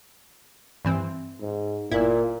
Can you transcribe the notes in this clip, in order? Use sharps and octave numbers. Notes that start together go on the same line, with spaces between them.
G2 E3 C4
G#2
G1 A#2 E4